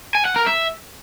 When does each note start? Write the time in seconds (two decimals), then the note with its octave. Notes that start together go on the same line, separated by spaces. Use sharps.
0.15 G#5
0.25 F#5
0.36 A#4
0.46 E5